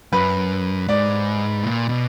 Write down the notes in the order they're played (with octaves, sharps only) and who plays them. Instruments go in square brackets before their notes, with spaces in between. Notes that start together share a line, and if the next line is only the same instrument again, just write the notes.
[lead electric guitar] F#2 [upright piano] B4
[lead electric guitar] G#2 [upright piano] D5
[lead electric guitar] A#2
B2